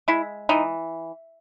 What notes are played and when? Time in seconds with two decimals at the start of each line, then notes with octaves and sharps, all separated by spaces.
0.08 G#3 E4
0.49 E3 D#4